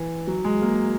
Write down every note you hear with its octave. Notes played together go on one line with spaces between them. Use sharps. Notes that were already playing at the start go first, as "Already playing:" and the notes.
Already playing: E3
F#3
G#3
A#3